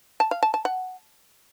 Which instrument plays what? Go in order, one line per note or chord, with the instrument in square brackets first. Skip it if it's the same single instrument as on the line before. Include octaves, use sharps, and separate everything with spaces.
[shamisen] A5
F5
A5
A5
F#5